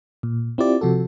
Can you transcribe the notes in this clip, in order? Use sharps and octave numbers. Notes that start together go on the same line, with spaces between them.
A#2
C4 E4 F4 G4 D5
C3 F3 F#4 A4